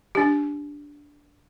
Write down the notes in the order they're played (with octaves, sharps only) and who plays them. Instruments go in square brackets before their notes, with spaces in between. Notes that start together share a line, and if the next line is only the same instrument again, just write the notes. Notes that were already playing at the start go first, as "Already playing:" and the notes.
[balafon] D4 G4